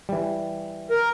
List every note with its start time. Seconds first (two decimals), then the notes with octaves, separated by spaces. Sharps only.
0.09 E3 G3
0.90 A#4